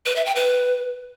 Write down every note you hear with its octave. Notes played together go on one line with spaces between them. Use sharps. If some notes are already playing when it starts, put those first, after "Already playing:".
B4
E5
G5
B4